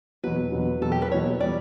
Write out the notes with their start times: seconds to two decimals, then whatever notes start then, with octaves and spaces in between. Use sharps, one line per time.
0.24 E2 B2 F#3 B4
0.52 E2 B2 F#3
0.81 E2 B2 F#3 A4
0.92 G4
1.02 B4
1.11 E2 B2 F#3 C#5
1.41 E3 G3 D5